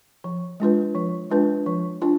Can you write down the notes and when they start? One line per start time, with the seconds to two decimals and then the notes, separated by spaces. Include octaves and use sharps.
0.24 F3
0.60 G#3 D4 F4 B4
0.95 F3
1.31 G#3 D4 F4 B4
1.66 F3
2.02 D4 F4